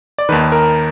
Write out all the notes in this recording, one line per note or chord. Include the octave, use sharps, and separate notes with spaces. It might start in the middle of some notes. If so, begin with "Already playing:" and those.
D5
D#2 D#3 B4
A#4